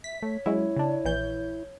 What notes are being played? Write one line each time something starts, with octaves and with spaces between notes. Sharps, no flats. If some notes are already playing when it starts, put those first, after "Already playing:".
E5 B6
A3 C#5
F#3 G#3 C#4 E4
C#3 D4
A#1 E3 G6